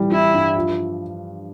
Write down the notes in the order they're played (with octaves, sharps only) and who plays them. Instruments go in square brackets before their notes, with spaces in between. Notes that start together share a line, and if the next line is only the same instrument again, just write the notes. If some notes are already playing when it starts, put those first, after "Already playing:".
Already playing: [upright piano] E3 G3
[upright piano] E3 [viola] E4
[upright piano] G2
F3